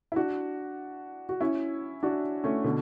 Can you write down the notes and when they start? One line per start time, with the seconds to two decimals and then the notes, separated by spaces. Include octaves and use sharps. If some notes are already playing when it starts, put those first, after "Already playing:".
0.12 E4
0.16 D4 F#4
1.29 F#4
1.41 C#4 E4
2.03 D4 F#4
2.44 A3 C#4
2.64 B2 D3